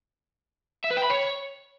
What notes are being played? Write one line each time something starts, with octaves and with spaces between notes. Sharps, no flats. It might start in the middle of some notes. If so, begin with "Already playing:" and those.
E5
B4
G5
B5
C#5